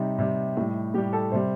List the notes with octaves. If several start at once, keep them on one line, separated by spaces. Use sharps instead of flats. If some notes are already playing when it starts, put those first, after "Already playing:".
Already playing: C3 G3 D#4
C3 G3
A2 G3
A2 G3 G4
A4
C3 G3 C5